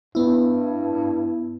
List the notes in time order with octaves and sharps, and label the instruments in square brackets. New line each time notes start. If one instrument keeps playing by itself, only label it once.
[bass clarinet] G2 [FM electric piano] B3 E4